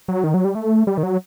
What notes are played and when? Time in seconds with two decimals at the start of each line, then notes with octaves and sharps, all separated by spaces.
0.08 F#3
0.24 D#3
0.34 F#3
0.45 G3
0.55 A3
0.87 G3
0.98 D#3
1.03 F#3